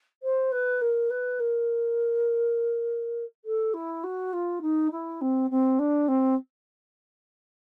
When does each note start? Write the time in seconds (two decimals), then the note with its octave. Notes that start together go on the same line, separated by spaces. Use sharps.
0.23 C5
0.52 B4
0.81 A#4
1.10 B4
1.40 A#4
3.45 A4
3.74 E4
4.04 F#4
4.33 F4
4.62 D#4
4.92 E4
5.21 C4
5.50 C4
5.79 D4
6.08 C4